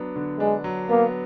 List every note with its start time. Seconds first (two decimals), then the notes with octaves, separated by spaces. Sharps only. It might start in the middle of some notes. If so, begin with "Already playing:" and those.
Already playing: F#3 B3 D4
0.16 D3
0.40 G#3 D4
0.64 F#3
0.89 A#3 B3